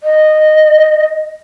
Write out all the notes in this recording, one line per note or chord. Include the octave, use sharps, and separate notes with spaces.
D#5